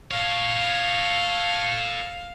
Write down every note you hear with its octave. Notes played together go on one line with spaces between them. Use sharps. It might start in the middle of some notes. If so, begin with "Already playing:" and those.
A4 C#5 F5